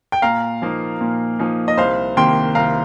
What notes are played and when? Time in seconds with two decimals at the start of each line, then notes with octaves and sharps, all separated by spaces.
0.12 G5
0.22 A#2 F5 A#5
0.62 F3 A#3 D#4
1.01 A#2
1.39 F3 A#3 D#4
1.68 D#5
1.77 C2 C5 F5
2.17 C3 D#3 A#3 G5 C6
2.55 C2 F5 A#5